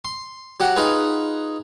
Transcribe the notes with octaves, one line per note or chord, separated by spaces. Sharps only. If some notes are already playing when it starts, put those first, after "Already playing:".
C6
F#3 G4 F#5
D#4 F4 G#4 B4